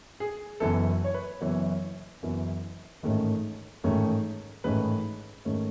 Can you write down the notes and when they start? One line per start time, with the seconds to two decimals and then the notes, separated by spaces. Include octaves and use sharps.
0.20 G#4
0.60 F#1 F#2 E3 B3 A4
1.04 C#5
1.14 B4
1.41 F#1 F#2 E3 B3 C#5
2.23 F#1 F#2 E3 B3
3.03 A1 G#2 D#3 A3 C#4
3.84 A1 G#2 D#3 A3 C#4
4.64 A1 G#2 D#3 A3 C#4 B4
5.45 G#2 D#3 A3 C#4